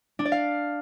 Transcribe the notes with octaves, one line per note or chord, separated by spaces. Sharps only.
D4
D5
F5